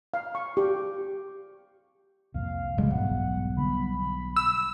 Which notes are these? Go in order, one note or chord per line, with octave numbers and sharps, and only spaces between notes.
F5
C#6
G4
C2 F2 A#2 F5
F#1 F#2 C#3 G3 G#3
D#1 B1 G#2 F#5
D3 G3 B3 B5
E6